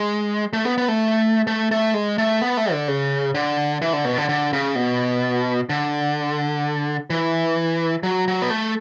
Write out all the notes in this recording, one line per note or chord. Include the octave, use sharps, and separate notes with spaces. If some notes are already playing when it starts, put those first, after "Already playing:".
Already playing: G#3
A3
B3
B3
A3
A3
A3
G#3
A3
B3
A3
D3
C#3
D3
E3
D3
B2
D3
D3
C#3
B2
D3
E3
F#3
F#3
B3
A3